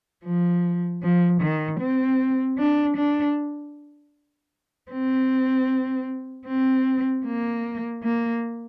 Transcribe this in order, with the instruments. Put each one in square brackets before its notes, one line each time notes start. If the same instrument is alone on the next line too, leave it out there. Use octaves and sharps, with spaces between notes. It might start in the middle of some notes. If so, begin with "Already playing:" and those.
[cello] F3
F3
D#3
C4
D4
D4
C4
C4
A#3
A#3